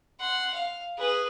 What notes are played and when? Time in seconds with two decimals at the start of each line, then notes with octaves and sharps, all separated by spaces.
0.19 F#5 C6
0.53 F5
0.98 G#4 B4